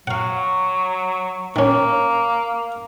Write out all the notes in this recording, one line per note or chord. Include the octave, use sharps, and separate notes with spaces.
F#3 F5 F#5
D#3 A#3 C#4